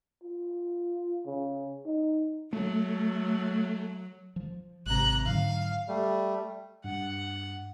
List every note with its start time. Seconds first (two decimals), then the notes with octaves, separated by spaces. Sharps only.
0.24 F4
1.26 C#3
1.86 D#4
2.53 F#3 A3
4.36 F3
4.86 G#1 C3 A#5 F#6
5.26 G#2 D3 F#3 F5
5.88 G3 A3
6.84 G2 F#5